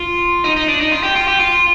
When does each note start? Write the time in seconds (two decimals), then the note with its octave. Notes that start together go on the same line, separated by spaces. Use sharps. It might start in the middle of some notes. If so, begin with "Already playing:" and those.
Already playing: F4
0.44 D#4
0.56 D#4
0.68 D4
0.81 D#4
0.92 F4
1.03 G4
1.16 F4
1.28 G4
1.40 F4